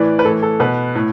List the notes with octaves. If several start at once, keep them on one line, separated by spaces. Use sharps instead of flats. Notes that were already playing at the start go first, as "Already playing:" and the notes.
Already playing: A2 E3 B4 D5
B4
A2 E3 A4
A4
B2 B4
A2